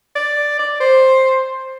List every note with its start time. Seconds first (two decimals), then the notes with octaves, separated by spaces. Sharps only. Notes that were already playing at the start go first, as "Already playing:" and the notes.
0.15 D5
0.59 D5
0.80 C5